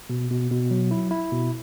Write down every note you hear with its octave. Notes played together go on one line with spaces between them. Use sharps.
B2
B2
B2
F#3
E4
E4
B2